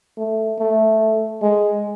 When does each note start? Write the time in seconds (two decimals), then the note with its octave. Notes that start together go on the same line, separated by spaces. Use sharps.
0.17 A3
0.59 A3
1.42 G#3